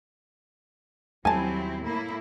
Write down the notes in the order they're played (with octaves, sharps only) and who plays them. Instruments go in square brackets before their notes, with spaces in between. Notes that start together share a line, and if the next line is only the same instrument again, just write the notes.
[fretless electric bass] D#2 G3 [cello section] F#3 C4 E4 [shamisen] C#4 A5 [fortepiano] G#5
[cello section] A2 A#3 E4